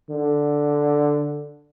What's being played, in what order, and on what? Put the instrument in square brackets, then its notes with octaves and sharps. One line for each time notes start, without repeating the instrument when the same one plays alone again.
[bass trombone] D3